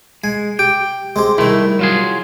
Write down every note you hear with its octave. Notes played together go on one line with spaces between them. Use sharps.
G#3 G#5
G4 G5
G#3 C4 G4
C2 D#3 A3 E4
F#3 F4 G#4